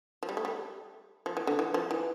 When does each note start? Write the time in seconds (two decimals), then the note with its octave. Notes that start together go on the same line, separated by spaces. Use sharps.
0.23 F3
0.29 G3
0.37 A3
0.45 G3
1.26 F3
1.37 E3
1.47 D3
1.59 E3
1.74 F3
1.91 E3